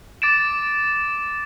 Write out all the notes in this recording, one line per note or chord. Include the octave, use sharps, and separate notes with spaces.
D6 A6 D7 E7